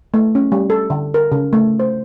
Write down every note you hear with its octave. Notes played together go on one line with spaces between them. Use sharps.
A3
C#4
G3
A4
D3
A#4
C#3
A3
C5